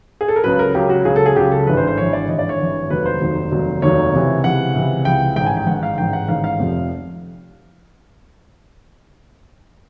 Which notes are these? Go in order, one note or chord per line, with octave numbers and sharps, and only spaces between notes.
G#4
A4
A#4
C#2 C#3 F#3 B4
A#4
C#2 C#3 F#3 G4
F#4
C#2 C#3 F#3 G#4
A4
G#4
C#2 C#3 F#3 G4
A4
G#1 G2 E3 B4
C5
C5
G#1 G2 E3 C#5
D5
G#1 G2 E3 D#5
D5
C#5
G#1 G2 E3
F1 D#2 D#3 F#3 B4
C5
F1 D#2 D#3 F#3
F1 D#2 D#3 F#3
F1 D#2 D#3 F#3 C#5
C#2 C3 E3
C#2 C3 E3 F#5
C#2 C3 E3
C#2 C3 E3 G5
A1 G#2 D#3 G5
G#5
G5
A1 G#2 D#3 F#5
F5
A1 G#2 D#3 G5
F#5
A1 G#2 D#3 F5
F5
F1 F2 C3 F3